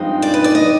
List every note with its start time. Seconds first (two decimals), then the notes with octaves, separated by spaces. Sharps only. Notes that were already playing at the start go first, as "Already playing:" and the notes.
Already playing: G2 F3 G#3 C4 D#4
0.22 D5
0.34 B4
0.44 D5
0.55 D#5